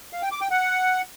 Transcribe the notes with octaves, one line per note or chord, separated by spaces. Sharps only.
F5
G5
D6
G5
F#5